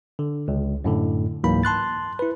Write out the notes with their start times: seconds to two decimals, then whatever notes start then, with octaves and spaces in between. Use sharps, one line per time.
0.19 D3
0.48 C#2
0.84 F#2 A2 D3
1.44 C#2 G#2 E3 F#3 A#3 B5
1.63 A5 C6 F#6 A6
2.19 E4 B4